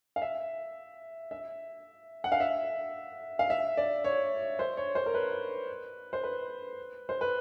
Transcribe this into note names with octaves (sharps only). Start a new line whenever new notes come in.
F5
E5
E5
F#5
F5
E5
F5
E5
D5
C#5
C5
C#5
C5
A#4
B4
C5
B4
C5
B4